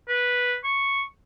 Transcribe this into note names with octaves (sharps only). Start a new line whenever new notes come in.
B4
C#6